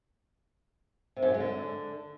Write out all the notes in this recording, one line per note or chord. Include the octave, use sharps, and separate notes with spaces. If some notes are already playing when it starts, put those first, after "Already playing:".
C3
F#2
F#3
G#3
D3